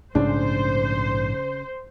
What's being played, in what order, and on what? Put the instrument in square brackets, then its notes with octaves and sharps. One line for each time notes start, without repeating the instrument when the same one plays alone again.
[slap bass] A#1 G#2 A3 [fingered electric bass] C#3 [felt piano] D4 [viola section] C5